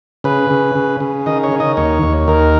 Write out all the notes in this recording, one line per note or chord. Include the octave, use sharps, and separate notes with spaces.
C#3 B4
C#3
C#3
C#3
D#3 D#5
C#5
D#3
D#5
D#2 C#5
D#2
D#3 A#4